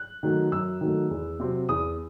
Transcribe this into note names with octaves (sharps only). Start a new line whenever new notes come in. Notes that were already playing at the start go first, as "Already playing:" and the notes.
Already playing: F#6
D#3 F#3 A3
F#2 E6
D#3 F#3 A3
E2
C3 F#3 C4
E2 D#6